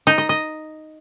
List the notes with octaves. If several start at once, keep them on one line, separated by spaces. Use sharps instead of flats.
D#4
D#5
D#5